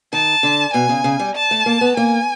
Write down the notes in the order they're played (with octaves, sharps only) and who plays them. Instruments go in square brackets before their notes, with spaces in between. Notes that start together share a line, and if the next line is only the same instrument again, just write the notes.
[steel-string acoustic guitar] D#3 [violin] A5
[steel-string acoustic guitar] D3
[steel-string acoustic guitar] B2 [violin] G#5
[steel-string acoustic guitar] C#3
C#3
G3
[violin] A5
[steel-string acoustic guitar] A3
A#3
B3
[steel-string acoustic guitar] A#3 [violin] G#5